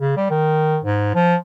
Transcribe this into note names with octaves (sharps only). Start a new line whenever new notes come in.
C#3
G3
D#3
G#2
F3